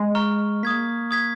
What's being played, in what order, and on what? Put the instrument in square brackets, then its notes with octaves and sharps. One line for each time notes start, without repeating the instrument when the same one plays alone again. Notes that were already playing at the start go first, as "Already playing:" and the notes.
Already playing: [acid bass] G#3
[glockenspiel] A#5 C#6 F6
[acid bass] A#3 [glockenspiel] D#6 G#6 B6
[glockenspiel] D#6 G#6 B6